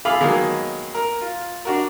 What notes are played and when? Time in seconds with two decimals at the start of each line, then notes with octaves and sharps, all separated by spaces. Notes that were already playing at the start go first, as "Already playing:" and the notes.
0.05 F4 G#4 A4 F5 B5 D6
0.21 D#3 F#3 G#3 A#3 B3
0.94 A#4
1.21 F4
1.65 D4 F#4 A#4